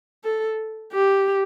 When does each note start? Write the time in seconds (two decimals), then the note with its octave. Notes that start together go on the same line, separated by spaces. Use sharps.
0.24 A4
0.92 G4